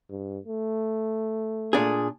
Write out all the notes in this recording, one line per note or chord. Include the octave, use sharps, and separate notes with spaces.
G2
A3
A#2 D4 G#4